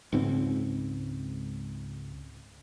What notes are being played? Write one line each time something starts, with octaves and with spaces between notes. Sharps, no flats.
C#2 G#2 C4